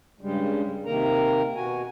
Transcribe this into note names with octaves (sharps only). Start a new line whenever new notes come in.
G2 C#3 G3 G#3
C3 D#3 A#3 A#4 A#5
B2 F#4 G#5